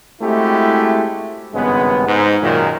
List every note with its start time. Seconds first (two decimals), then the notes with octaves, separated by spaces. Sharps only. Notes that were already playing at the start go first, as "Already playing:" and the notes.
0.22 G#3 A3 C4 E4 F#4 G4
1.55 G#1 G2 C#3 G#3 B3
2.07 G#2
2.42 F#2 A#2 D#3